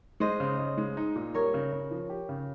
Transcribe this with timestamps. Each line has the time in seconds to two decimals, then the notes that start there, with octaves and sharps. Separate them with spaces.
0.20 G#3 C5 D#5
0.40 C#3
0.59 C#3
0.78 G#3
0.97 D#4
1.16 A#2
1.34 G3 A#4 C#5
1.54 C#3
1.73 C#3
1.91 F3
2.10 G4
2.29 C#3